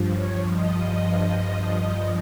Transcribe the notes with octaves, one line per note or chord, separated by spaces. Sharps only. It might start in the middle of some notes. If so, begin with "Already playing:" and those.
Already playing: G2 F3
C#5
D#5